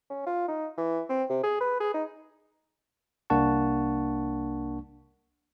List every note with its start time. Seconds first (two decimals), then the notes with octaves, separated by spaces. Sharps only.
0.10 C#4
0.26 F4
0.48 D#4
0.78 E3
1.09 C4
1.30 C3
1.43 G#4
1.61 B4
1.80 G#4
1.94 D#4
3.30 C2 A#3 D4 F#5 A5 C#6